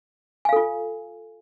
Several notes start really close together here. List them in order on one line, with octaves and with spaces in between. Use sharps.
G#5 F5 A4 F4